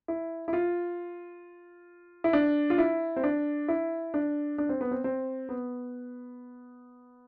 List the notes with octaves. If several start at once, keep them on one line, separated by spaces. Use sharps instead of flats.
E4
E4
F4
E4
D4
F4
E4
C4
D4
E4
D4
D4
C4
B3
C4
C4
B3